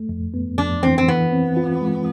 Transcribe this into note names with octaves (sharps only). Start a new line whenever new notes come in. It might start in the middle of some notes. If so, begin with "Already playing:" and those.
Already playing: A3
F2
B3
F2 D4
E3 C4
C4
E3 B3
C4
F4
G#3